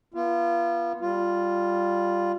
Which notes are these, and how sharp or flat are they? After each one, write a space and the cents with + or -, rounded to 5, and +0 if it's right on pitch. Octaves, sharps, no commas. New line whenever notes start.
B3 -30 F4 -30
G3 +0 F4 +0